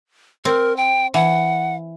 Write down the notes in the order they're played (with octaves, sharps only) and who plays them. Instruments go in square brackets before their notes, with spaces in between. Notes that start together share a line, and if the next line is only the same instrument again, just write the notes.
[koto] C4 [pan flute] A#4
[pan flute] G5
[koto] E3 [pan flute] F#5